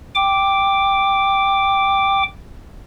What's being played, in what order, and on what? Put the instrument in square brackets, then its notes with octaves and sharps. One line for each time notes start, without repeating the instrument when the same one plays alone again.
[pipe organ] G5 D6